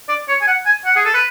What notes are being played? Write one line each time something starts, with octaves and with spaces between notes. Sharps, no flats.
D5
C#5
G#5
F#5
G#5
F#5
G#4
A4
B4